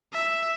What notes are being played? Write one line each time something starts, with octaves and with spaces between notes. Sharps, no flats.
E5